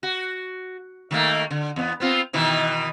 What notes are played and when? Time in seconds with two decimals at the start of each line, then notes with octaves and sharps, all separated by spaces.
0.03 F#4
1.11 D#3 A3 A#3
1.50 D3
1.76 E2 B3
2.00 B3 C4 F4
2.33 B2 D#3 E3